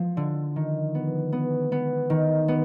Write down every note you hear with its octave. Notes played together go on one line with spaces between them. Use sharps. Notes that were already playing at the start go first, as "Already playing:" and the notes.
Already playing: F3 B3
D3
D#3
B3
B3
B3
D#3
B3